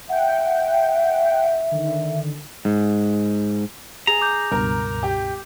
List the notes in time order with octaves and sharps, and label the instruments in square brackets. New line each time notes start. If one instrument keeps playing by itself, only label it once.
[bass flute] E5 [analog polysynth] F#5 G5
[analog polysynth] D3 D#3
[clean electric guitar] G#2
[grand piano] G#4 [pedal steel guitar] A#5
[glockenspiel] D6 G6
[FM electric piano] C#2 G2 B2 [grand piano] A#4
[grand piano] G4